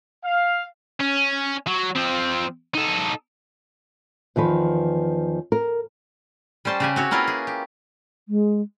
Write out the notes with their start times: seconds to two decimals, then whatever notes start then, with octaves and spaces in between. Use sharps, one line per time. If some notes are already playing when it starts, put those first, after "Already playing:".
0.24 F5
1.00 C#4
1.67 F#3
1.96 F3 C4
2.74 D#4 A4
4.36 E2 D#3 F3 B4
5.52 A#4
6.65 G3 C#4 C5 A5 C6
6.80 C#3 G4 G#5
6.96 C4 F#4 C#5
7.11 A#3 C#4 E4 F4 A#4 B4
7.27 G#4
7.47 G4
8.27 G#3